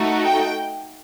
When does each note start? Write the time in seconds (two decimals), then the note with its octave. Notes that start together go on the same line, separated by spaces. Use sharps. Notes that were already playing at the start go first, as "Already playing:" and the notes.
Already playing: A3 D#4 F#4 A4
0.23 G5